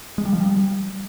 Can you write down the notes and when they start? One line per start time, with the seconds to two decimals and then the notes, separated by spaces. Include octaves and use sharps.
0.18 G#3
0.25 G3
0.33 F3
0.40 G3